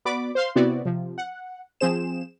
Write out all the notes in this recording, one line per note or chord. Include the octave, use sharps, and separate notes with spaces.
B3 F#4 D5 B5 D6
C5 F5 C6
C3 B3 C4 E4 F#4 D5
C3 F3
F#5
F3 C4 G#4 C5 E7